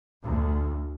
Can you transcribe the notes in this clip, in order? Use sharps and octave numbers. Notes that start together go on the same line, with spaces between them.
D2